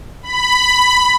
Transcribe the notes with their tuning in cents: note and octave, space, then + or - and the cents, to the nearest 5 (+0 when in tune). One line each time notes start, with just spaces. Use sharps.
B5 +10